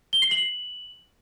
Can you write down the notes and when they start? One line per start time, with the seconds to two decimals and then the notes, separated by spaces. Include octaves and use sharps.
0.13 G7
0.22 C7
0.31 F#7